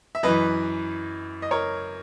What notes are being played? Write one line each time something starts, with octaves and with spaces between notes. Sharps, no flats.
E5
F#2 E3 B4 D#5
D#5
A#4 C#5